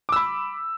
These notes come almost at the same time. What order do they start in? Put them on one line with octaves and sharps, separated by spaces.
D6 E6 B5